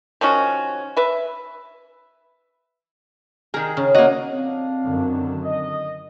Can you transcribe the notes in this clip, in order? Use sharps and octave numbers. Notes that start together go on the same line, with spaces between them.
D#3 F3 C#4 F#4
B4 E5
D#3 G#4 A#4
C#3
A#3 F#4 D#5
F2 C4 D4 F5
F#2 D3 D#3
D#5